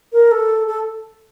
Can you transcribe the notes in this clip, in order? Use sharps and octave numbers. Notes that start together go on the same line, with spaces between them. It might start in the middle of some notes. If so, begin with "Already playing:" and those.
A#4
A4
A4